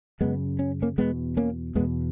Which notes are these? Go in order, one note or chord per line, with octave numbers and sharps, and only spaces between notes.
F#2 C#3 G#3 B3
C#4
A#3 C#4
E2 B2 G#3 B3
A#3 C#4
E2 B2 G#3 B3